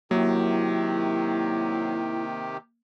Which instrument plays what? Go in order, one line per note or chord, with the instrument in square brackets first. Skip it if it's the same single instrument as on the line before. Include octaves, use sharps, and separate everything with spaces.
[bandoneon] C3 D#3 G4 [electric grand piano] F#3 [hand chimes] A#3 [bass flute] E4